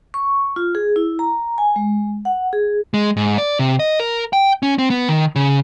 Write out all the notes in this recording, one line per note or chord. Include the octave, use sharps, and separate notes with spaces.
C#6
F4
G#4
E4
A#5
G#5
G#3
F#5
G#4
G#3
G#2
D5
C3
D#5
A#4
G5
C#4
C4
B3
D#3
C#3